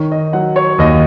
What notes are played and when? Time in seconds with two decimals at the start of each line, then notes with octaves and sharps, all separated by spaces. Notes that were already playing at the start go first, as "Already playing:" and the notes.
Already playing: D#3 C#5
0.12 D#5
0.33 F#3 F#5
0.56 C#5
0.79 D#2 D#5